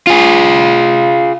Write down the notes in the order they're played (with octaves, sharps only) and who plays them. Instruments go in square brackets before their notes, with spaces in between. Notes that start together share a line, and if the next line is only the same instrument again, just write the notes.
[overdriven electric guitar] F4 G#4